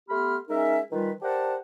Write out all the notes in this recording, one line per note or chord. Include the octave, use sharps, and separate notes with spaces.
A3 B3 G4 B5 C6 F6
G#3 C#4 D#4 A#4 E5
D#3 E3 G3 F4 B4
G4 A#4 C5 D5 F#5 A5